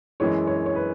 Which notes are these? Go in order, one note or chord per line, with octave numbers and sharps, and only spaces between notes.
F#2 E3 G#3 C#5
C#5
C#5
B4